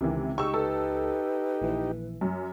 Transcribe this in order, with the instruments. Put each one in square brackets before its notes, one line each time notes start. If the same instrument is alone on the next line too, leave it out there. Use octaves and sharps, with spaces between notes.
[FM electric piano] C#2 [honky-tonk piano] C3 D#3 E3
[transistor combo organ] D#4 G4 [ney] G#4 [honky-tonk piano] C#6 E6
[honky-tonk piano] A4 [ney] B4
[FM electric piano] A#1 E3
[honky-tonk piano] F#2